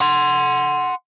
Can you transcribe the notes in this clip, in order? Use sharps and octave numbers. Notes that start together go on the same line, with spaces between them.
F#5 C6